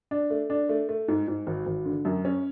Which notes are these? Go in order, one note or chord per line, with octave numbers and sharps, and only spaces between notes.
D4
A3
D4
A3
A3
G#2
G#2
G#1
G#1
D3
F#2
C#4